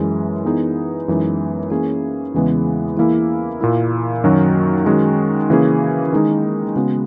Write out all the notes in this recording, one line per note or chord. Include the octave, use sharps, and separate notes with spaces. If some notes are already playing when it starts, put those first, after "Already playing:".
Already playing: F#2 E3 G#3
E3 B3 D#4 G#4
F#2 E3 G#3 D#4
E3 A#3 C#4 G#4
E2 C#3 E3 G#3 B3
E3 A#3 E4 G#4
A#2 A#3 E4
F#2 D#3 F#3 C#4 F#4
D#3 G#3 C#4 F#4
C#3 E3 A#3 C#4 G#4
D#3 G#3 D#4
C#3 G#3 B3 F#4